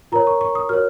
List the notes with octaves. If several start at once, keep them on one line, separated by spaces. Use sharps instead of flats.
F4 A#4 C#5 A#5
C#6
C#6
D#6
F#4 A#4 C#5 F6